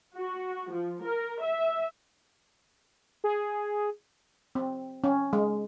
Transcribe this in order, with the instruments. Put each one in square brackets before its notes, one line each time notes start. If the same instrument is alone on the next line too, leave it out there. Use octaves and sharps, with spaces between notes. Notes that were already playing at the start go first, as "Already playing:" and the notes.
[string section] F#4
F3
A#4
E5
[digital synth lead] G#4
[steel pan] C4
C#4
G#3